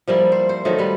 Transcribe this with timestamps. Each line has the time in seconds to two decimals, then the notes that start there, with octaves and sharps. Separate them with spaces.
0.08 F3 G3 A#3 E4
0.32 C5
0.49 C5
0.65 D#3 F3 F#3 A3
0.79 G3 B4